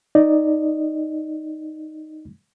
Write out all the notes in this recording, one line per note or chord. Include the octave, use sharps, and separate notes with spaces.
D#4 D5 D#5